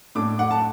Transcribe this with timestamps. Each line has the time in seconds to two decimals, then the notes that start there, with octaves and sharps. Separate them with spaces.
0.15 A2 A3 D4 D6
0.39 F#5
0.51 A5